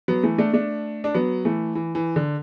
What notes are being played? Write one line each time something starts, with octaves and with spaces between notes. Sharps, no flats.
F#3 B3
E3 A3
A3 D4
A3 D4
D4
F#3 B3
E3 A3
E3
E3
D3